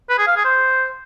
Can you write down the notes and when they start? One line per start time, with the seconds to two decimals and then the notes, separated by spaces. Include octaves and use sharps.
0.09 B4
0.18 G#4
0.27 F5
0.36 G#4
0.45 C5